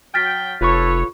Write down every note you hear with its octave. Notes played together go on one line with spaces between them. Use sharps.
F#3 G5 F6 A6 B6
F1 F4 A4 B4 C#5 B5 C#6